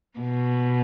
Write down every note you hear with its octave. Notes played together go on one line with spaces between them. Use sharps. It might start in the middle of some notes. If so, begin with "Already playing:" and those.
B2